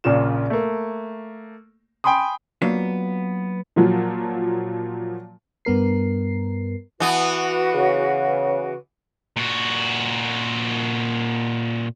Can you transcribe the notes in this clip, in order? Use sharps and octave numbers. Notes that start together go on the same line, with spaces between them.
A#1 A#2 C#3 F4 E7
A3 A#3
G5 G#5 B5 C6 D#6
F#3 A#3 B3 D4 F4
A#2 F3 F#3
G2 B3 A#4 C7
E3 B3 F#4 B4
C#3
A#2 F#4